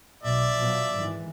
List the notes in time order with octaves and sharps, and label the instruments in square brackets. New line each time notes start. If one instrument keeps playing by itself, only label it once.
[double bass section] B1 B2 [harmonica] D5 E5
[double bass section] B2 F3 F#3
G#1 G#2 E3